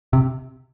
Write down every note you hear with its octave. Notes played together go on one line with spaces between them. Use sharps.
C3